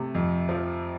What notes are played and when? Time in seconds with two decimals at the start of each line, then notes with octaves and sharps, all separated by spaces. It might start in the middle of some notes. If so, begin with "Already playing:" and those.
Already playing: C3 A3
0.15 F2
0.49 F3